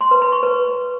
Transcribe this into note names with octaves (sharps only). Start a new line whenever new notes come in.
C6
B4
B5
C#6
B4